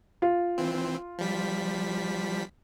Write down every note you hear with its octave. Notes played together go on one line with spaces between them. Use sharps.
F4
E3 C4
F3 G3 B6